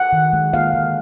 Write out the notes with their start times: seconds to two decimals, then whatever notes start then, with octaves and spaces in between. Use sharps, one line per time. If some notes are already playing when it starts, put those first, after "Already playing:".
Already playing: F#5
0.13 D#3
0.33 G#3
0.54 A#3 F5
0.74 D3